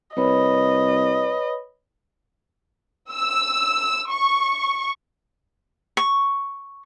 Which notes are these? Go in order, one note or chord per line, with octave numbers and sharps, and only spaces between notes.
C2 B4 C#5 D#5 B5
E6
C#6
C#6